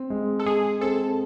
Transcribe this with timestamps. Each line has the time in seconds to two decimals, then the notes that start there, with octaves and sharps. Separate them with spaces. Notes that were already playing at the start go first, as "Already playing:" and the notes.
Already playing: C4
0.10 G#3
0.40 A4
0.46 G#3 G#4
0.81 C4 A4